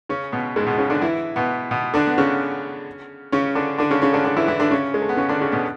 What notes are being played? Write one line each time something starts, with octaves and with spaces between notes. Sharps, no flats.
C#3 C#4
B2 B3
G#2 G#3
B2 B3
C#3 C#4
D3 D4
E3 E4
B2 B3
B2 B3
D3 D4
B3
C#3 C#4
C#3 C#4
D3 D4
D3 D4
C#3 C#4
C#3 C#4
D3 D4
D3 D4
E3 E4
E3 E4
D3 D4
C#3 C#4
G#3
A3
B3
C#3 C#4
D3 D4
C#3 C#4
B2 B3